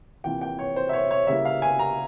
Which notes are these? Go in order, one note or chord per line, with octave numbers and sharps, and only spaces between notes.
C3 E3 A#3 F4 G5
G5
C#5
C5
E5
C#5
C#5
C#3 G3 A#3 E4 E5
F5
G#5
A#5